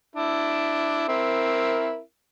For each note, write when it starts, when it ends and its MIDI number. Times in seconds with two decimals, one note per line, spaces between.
0.15 1.07 62
0.15 1.07 64
1.09 2.00 60
1.09 2.00 64
1.09 2.00 70